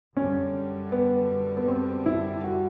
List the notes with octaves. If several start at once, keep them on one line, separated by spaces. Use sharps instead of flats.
F#2 D3 G3 C#4
B3
B3
C4
E4
F#4